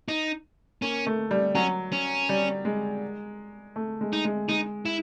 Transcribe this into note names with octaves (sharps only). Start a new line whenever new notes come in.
D#4
A#3 C#4
A3
G3
F#3 C#4
C#4
G3
G#3
A3
G#3
D#4
G#3
G#3 D#4
E4